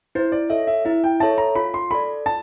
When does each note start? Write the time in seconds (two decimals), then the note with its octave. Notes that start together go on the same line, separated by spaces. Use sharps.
0.15 E4 C5
0.32 D5
0.50 A4 C#5 D#5 E5
0.67 E5
0.85 E4 E5
1.04 G5
1.20 A4 C#5 E5 A5
1.38 A#5
1.55 F4 B5
1.74 C6
1.91 A4 D5 B5
2.26 F4 A5